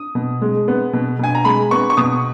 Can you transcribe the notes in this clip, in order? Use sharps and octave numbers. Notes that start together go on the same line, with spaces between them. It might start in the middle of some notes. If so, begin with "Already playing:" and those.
Already playing: D#6
B2
G#3
B3
B2
B2 G#5
A#5
G#3 B5
B3 C#6
C#6
B2 D#6